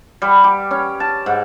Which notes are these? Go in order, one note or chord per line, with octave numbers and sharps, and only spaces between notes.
G3
G4
C#4
A5
G#2